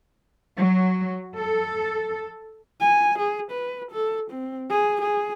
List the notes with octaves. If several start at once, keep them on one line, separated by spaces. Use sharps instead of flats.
F#3
A4
G#5
G#4
B4
A4
C4
G#4
G#4